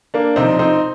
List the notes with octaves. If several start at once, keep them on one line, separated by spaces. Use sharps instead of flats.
A#3 D4
C3 F3 C4 D#4
C4 D#4